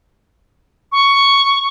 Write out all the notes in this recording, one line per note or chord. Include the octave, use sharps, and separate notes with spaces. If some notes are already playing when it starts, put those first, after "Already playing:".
C#6